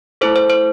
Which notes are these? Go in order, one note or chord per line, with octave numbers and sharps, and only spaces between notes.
A3 E4 A4 C5
C5
C5